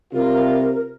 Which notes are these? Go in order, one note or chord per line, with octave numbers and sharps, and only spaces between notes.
C3 G3 E4 F4 A#4